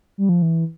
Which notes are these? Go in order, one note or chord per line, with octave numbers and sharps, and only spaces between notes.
G3
F3
E3